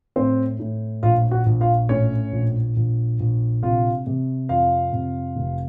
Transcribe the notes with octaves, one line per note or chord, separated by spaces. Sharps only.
A2 C4 C5
A2
A#1 F4 F5
F#4 F#5
A#1
F4 F5
A2 C#4 C#5
A#1
A#1
A#1
C3 F4 F5
C3
F2 F4 F5
C3
F1